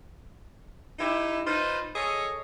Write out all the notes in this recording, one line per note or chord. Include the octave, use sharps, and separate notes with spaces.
D#4 E4 G4
D#4 F4 B4 C5
G#4 A4 C#5 D#5